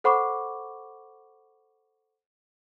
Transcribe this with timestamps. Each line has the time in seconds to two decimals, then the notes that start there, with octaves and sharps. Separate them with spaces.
0.04 A4 C5 F#5 B5 C#6 D6